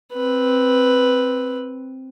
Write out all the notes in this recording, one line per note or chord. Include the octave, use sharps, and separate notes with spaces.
C4 B4